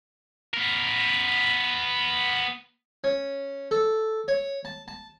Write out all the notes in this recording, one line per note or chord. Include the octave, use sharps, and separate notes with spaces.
B3 A#4
C#4
A4
C#5
A5
A5